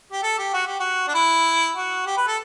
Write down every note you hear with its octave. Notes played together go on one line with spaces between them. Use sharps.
G4
A4
G4
F#4
G4
F#4
D4
E4
F#4
G4
B4
A4